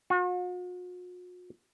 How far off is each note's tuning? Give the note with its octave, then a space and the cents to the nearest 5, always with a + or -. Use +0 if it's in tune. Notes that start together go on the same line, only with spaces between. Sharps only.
F#4 -45